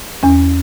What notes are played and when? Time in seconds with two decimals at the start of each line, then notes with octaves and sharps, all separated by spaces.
0.23 E2 C#4